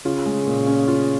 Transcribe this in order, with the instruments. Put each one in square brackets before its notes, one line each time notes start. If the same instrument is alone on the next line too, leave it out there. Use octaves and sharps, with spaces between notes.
[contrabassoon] C#3 [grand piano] F4
[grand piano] G#3
A#2
C#4
F4